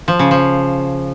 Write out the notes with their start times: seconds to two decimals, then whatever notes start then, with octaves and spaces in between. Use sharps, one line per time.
0.08 F3
0.19 C#3
0.31 F3